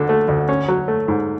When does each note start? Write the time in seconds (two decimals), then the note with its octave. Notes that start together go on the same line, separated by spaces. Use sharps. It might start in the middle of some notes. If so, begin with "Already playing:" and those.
Already playing: D2 D3 A4
0.09 A3
0.28 D2
0.49 C#4
0.68 F#3
0.88 A3
1.08 G#2